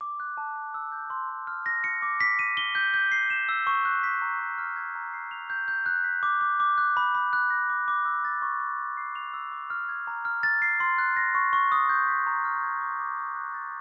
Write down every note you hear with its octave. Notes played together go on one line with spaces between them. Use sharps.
D6
F#6
A5
A5
E6
G6
C6
C6
F6
A#6
C#7
D6
B6
D#7
G7
G6
G6
C7
E7
E6
C#6
F#6
B6
A#5
C#6
F6
G#6
A#5
C7
F7
G6
G6
F#6
B6
D6
D6
D6
F#6
B5
B5
F#6
A#6
D6
D6
E6
A6
C#6
C#6
A6
C7
F7
E6
D6
F6
G#6
A#5
F6
A6
C7
C6
F#6
A#6
C#6
C#6
D#6
G6
B6
A#5
F6
G#6
D6
D6
D#6
F#6
A6